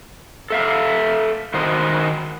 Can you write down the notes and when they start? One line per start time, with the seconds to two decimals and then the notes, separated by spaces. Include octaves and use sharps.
0.50 A4 E5 F5
1.54 D#3 F#4 C5 D#5